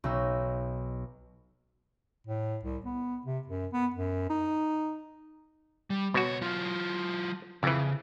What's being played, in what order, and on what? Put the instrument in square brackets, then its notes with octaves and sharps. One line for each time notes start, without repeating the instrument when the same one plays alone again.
[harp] B1 D#4 E6
[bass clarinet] A2
C2
B3
C3
F#2
B3
F#2
D#4
[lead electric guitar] G3
[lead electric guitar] C#2 C#5 [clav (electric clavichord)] B2 F#4
[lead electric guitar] F#3 F4
[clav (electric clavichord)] F2 E3 [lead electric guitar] C#3